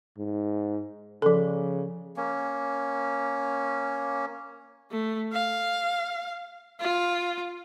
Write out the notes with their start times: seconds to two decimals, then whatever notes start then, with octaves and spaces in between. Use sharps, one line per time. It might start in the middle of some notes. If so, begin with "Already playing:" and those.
0.18 G#2
1.22 C#3 F3 A4
2.17 A#3 C#4
4.91 A3
5.33 F5
6.80 F4